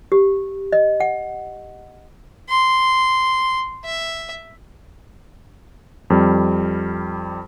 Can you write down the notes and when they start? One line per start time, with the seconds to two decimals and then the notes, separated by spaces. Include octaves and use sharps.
0.12 G4
0.72 D#5
1.00 F#5
2.49 C6
3.85 E5
6.10 F2 G3